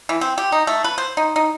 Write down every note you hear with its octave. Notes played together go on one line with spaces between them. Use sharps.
E3
C4
G4
D#4
A3
B4
C5
D#4
D#4